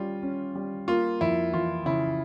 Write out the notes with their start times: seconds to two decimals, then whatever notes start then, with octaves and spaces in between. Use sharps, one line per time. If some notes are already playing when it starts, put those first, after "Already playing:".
Already playing: G3 C#4 F4
0.23 C#4
0.55 G3
0.88 A#3 F4
1.21 F2 E4
1.53 E3 F4
1.86 C#3 E4